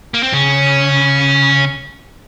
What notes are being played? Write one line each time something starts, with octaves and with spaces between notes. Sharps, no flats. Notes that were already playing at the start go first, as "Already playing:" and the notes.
A#3
C4
C#3 C#4